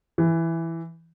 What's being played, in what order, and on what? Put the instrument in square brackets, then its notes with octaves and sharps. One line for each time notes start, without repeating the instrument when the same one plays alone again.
[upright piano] E3